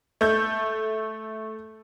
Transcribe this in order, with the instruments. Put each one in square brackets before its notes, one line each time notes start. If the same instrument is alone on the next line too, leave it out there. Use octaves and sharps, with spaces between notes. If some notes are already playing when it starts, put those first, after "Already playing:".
[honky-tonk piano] A3 G6